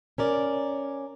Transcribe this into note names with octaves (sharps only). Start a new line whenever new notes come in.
C#4 A#4 D5